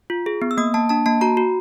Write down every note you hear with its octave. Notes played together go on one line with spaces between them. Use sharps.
F4
G#4
B3
E6
A#3 D#6
A#3 A5
D4 A5
A#3 A5
F#4 A#5
F#4